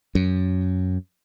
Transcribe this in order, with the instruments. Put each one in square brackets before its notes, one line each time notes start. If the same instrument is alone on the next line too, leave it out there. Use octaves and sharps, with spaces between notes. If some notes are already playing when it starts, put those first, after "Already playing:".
[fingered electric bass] F#2